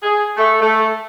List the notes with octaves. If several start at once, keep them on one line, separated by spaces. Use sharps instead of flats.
G#4
A3
A3